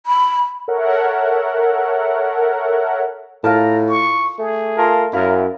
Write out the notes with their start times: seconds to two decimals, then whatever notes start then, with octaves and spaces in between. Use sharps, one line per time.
0.06 B5
0.68 A4 A#4 C#5 E5 F#5
3.44 A2 F4 A#4 A5 A#5
3.88 C#6
4.39 A3 G#4
4.76 F4 A#4 A5
5.13 F#2 E4 A#4 F5